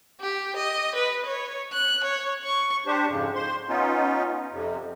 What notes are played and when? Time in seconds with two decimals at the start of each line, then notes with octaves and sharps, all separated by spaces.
0.20 G4
0.56 D#5
0.95 B4
1.26 C#5
1.73 F#6
2.04 C#5
2.44 C#6
2.86 D4 G4 C5
3.08 F2 G#2 C#3
3.35 C5 C6
3.68 B3 C#4 D#4 F4
4.52 F2 C3